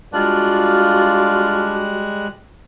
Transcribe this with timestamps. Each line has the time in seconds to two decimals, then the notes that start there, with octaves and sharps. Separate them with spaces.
0.13 G3 G#3 D4 F4 F#4 F#6